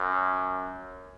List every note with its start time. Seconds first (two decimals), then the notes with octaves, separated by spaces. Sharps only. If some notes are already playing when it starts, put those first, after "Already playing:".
Already playing: F#2